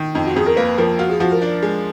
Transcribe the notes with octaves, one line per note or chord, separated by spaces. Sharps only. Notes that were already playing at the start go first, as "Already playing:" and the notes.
Already playing: D#3
F2 D#4
F#4
F2 G#4
A#4
A#3 B4
F3 A#4
F4 F#4
G#4
F3 F#4
A#4
D4
G#3